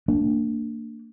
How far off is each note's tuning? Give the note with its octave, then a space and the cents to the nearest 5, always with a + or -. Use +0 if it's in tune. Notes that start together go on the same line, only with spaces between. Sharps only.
A#3 -35 D4 +0